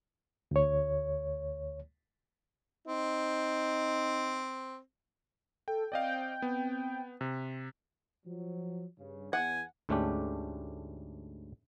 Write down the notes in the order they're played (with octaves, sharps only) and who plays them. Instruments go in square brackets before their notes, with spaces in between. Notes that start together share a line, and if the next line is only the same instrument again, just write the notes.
[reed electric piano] D2 C#5
[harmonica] C4 [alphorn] D#4
[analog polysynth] A4 [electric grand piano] G5
[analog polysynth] C4 G5 [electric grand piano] D5 D#5 F5
[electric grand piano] B3
C3
[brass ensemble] F3 F#3
G2 C#3
[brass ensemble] E2 [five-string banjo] F#5 [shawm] G#5
[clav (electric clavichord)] D2 G#2 A3 C#4 D4 G4